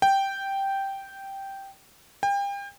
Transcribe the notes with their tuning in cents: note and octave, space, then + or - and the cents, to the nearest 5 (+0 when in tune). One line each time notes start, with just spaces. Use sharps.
G5 -5
G5 +35